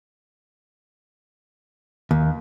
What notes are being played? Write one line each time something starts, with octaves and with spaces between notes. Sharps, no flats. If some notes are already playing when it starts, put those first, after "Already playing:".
D#2